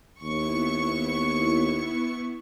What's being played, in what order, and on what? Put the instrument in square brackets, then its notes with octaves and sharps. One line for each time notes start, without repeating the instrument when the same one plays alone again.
[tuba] D#2 [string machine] B3 E4 [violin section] C#6